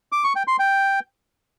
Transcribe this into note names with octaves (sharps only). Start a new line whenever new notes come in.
D6
C#6
G5
C6
G5